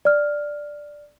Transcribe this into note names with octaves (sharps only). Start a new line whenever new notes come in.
D5 F6